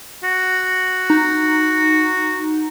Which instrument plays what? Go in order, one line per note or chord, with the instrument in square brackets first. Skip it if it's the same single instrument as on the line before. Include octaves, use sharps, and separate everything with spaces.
[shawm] F#4
[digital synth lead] D#4